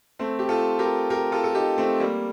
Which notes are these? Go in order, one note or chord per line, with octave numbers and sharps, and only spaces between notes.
A3 C4
G4
F4 A4
G4 A#4
G4 A#4
F4 A4
A4
D#4 G4
A3 C4
G3 A#3